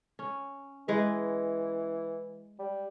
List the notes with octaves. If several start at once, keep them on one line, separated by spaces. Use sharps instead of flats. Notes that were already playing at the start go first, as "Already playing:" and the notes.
C#4
E3 G#3 B4
G3